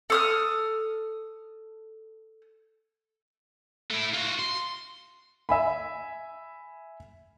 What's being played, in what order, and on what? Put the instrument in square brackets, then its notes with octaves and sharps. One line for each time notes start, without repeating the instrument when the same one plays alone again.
[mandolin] A4 D#6 F6
[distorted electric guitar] A3 E4
F4 F#4
C6
[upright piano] E5 G#5 B5